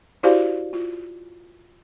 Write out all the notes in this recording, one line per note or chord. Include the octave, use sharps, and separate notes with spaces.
E4 F#4 G4 C5 D5 F5
F4